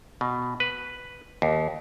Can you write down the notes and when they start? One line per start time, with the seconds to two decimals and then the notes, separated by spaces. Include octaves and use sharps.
0.21 B2
0.60 B4
1.42 D#2